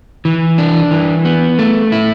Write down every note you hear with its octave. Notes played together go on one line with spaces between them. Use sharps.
E3
D4
E3
B3
A3
E4